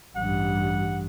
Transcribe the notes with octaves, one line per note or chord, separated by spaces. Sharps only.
A1 G2 F#5